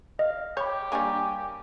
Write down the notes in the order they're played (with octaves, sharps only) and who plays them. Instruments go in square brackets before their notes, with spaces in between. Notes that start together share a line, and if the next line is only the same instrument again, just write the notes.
[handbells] D#5 [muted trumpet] F5
[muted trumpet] G4 [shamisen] C#5 [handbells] B5 G6
[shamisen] G3 A#3 [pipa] D4 G#5 C#6